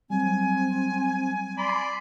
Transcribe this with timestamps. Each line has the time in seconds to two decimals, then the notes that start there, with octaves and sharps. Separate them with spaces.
0.10 F#3 G3 C4 G#5
1.58 D5 B5 C6